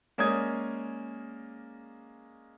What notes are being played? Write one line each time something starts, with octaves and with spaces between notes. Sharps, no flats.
G#3 A#3 C#4 D5 D#6 G#6